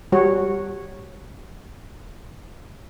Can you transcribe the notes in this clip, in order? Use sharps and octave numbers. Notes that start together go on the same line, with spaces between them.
G3 F#4 C#5